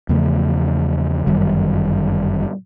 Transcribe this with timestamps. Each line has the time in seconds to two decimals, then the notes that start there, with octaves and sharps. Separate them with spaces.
0.09 E2 C#3 F3 A3
1.27 G1 F#2 D#3 G3